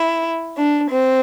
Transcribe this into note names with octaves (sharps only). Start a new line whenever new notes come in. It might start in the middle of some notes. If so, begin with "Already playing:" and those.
Already playing: E4
D4
C4